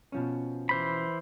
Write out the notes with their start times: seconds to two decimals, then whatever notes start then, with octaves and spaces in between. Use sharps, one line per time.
0.12 B2 F3 C#4
0.69 E3 C5 B5